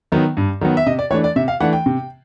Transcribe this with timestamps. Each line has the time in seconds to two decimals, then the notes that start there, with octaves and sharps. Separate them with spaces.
0.12 D#3 F#3 B3
0.37 G2
0.61 D#3 F#3 B3
0.77 E5
0.86 C3 D#5
0.99 D5
1.10 E3 A3 D4 C#5
1.24 D5
1.36 C3 E5
1.48 F5
1.60 E3 A3 D4 F#5
1.73 G5
1.86 C3